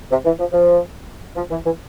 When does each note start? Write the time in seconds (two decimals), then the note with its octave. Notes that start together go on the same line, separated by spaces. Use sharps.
0.11 C3
0.25 E3
0.39 F3
0.52 F3
1.36 F3
1.50 E3
1.65 E3